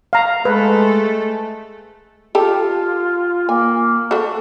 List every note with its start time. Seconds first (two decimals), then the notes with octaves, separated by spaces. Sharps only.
0.13 F5 A#5
0.45 G#3 A3 A4 B4
2.35 F4 G4 A4
3.49 A#3 G#5
4.11 A3 F#4